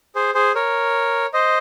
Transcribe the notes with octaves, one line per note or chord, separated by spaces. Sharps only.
G#4 C5
G#4 C5
A#4 C#5
C5 D#5